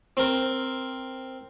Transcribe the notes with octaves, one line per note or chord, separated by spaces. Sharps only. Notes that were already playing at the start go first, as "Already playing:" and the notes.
C4 A#4